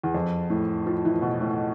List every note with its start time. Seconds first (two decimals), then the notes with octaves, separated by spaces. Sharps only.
0.03 E2
0.14 F2
0.50 A2
0.86 F3
1.05 E3
1.22 B2
1.41 A2